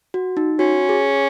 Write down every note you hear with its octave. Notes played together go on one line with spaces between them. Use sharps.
F#4
D#4
C#4 F#4
G#4